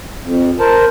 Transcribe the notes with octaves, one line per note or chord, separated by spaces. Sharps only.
F2
A#4 C5 A5